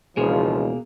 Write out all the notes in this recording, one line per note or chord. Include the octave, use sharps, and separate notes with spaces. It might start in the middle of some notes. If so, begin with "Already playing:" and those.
E1 C#2 B2 F3 A#3 G#4